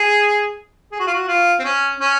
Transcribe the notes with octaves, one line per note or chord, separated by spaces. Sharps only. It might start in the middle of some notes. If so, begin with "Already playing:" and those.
Already playing: G#4
G#4
F#4
F4
F#4
F4
C4
C#4
C#4